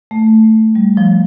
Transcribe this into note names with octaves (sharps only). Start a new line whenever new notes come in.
A3
G3
F3